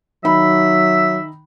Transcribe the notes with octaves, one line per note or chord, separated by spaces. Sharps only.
D#3 F#3 D#4 E5 B5